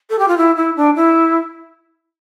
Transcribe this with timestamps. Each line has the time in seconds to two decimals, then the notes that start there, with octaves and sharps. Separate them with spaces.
0.10 A4
0.19 G4
0.28 F4
0.38 E4
0.57 E4
0.77 D4
0.96 E4